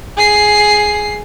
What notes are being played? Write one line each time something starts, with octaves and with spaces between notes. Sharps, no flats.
G#4 C7